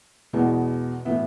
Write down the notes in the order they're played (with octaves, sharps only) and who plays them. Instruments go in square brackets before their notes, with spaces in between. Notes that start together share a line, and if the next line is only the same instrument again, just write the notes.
[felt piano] E2 B2 G#3 B3
A2 E3 B3 E5